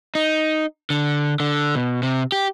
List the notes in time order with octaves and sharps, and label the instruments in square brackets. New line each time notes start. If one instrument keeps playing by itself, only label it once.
[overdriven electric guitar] D#4
D3
D3
B2
C3
G4